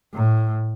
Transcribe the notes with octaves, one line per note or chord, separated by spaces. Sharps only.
A2